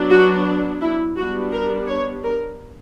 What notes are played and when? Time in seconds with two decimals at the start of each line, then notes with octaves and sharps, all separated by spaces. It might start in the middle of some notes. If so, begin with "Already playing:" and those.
Already playing: F#3 B3 D4
0.11 F#4
0.81 E4
1.17 G3 B3 D4 F#4
1.52 A#4
1.88 C#5
2.24 A#4